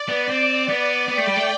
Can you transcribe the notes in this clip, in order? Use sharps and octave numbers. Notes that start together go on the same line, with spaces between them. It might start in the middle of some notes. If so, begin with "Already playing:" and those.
Already playing: D5
B3
C4
B3 D5
B3 G5
A3
G3
A3